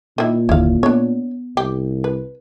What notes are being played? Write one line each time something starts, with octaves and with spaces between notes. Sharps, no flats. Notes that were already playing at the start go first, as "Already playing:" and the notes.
A#2 D#3 E4
F#1 D#2 D3 E4 F5
B3 D4 C#5
C2 G4
B4